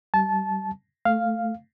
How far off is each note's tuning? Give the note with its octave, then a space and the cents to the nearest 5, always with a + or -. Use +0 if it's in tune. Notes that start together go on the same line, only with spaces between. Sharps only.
G3 -25 A5 -20
A3 +0 F5 +0